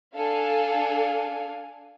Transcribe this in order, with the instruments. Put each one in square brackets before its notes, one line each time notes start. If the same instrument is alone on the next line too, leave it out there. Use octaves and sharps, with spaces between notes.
[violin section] D4 A4 F5 G#5